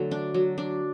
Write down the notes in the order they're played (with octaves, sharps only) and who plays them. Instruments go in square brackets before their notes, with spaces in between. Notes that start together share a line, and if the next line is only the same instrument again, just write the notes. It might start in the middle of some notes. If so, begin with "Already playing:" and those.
Already playing: [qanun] D3 F#3 A3
D4
F#3
D4